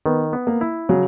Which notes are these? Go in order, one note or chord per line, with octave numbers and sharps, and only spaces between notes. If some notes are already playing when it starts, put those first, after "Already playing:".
D#3 B3
B3
A#3
E4
C#3 F#3